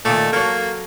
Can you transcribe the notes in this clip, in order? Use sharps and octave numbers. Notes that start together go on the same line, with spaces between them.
A#2 D#3 A3
F#3 A#3 A4